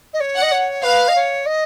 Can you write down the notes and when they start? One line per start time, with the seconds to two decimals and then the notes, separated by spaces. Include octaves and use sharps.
0.13 D#5
0.20 C#5
0.36 F#5
0.42 D#5
0.51 C#5
0.83 B4 F5
1.08 D#5
1.15 C#5
1.46 D#5